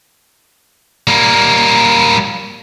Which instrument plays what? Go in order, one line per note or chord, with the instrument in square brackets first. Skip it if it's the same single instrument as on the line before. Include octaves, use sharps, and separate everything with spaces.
[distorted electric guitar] G3 A#3